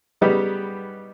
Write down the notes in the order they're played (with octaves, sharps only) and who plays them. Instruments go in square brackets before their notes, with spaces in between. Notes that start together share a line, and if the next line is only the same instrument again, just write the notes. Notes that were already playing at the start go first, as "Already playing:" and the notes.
[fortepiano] C#3 G3 B3 D#4 G4